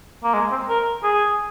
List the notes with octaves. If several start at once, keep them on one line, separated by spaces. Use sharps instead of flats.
A#3
G#3
C4
A#4
G#4